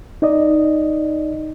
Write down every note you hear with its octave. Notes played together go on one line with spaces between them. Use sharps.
D#4 D5 D#5